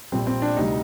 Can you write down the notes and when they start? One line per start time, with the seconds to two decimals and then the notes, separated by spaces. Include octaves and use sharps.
0.12 A#1 A#2 G3 C4
0.27 C4
0.42 D4
0.56 D2 C3 G3 D#4